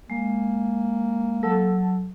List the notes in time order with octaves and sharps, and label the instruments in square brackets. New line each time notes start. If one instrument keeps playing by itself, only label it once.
[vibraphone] G#3 [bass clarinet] A#3
[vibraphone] F#3 [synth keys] A4